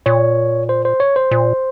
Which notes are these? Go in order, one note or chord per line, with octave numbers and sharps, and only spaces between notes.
A#2 C#5
C5
C5
C#5
C5
A#2